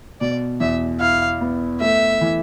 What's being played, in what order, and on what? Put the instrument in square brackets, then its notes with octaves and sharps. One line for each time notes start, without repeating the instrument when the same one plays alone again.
[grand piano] B2 [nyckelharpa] D5
[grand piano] E2 [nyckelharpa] E5
[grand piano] E4 [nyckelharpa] F5
[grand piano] B3
[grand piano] A3 [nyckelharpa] E5
[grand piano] E3